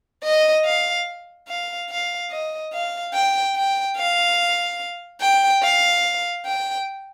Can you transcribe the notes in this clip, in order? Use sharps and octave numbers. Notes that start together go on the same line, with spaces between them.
D#5
F5
F5
F5
D#5
F5
G5
G5
F5
G5
F5
G5